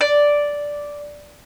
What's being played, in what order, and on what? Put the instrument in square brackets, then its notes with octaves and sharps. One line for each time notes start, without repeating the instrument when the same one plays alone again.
[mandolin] D5